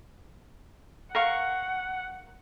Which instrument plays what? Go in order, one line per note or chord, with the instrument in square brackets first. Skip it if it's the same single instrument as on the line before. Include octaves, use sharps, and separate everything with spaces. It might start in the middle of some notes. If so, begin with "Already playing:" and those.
[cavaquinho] A#4 F5 C#6 [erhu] F#5